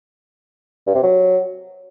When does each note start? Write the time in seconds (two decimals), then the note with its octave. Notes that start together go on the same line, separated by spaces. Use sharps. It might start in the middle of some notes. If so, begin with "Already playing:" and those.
0.87 G2
0.95 C3
1.03 F#3